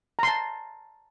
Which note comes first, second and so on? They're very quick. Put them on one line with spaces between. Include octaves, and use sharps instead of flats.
A#5 C6 A5